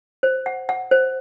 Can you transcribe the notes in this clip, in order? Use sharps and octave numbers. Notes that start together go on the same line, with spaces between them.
C5
F#5
F#5
C5